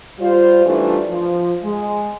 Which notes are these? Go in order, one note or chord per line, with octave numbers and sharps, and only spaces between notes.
G3 F4 C5
E3 G3 A3 D4 D#4 F4
F3
G#3